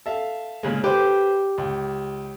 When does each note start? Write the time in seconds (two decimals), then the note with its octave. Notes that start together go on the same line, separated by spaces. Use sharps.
0.06 A4 E5 F5
0.63 A#2 C#3 G#3
0.84 G4 B4 C5
1.58 C#2